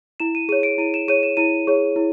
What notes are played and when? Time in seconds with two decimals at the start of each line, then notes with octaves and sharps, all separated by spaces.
0.20 E4 E7
0.35 D#7
0.49 G#4 C#5 D#7
0.63 D7
0.78 E4 D#7
0.94 E7
1.08 G#4 C#5 D#7
1.23 E7
1.37 E4 D#7
1.67 G#4 C#5
1.96 E4